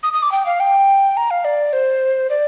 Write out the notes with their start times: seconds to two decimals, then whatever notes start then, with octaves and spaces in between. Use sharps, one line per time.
0.03 D#6
0.13 D#6
0.22 D6
0.32 G5
0.46 F5
0.60 G5
1.17 A#5
1.31 F5
1.45 D5
1.73 C5
2.30 D5